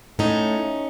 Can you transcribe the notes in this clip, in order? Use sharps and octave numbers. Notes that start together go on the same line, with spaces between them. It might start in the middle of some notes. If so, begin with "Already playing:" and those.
A2 C#4 D#4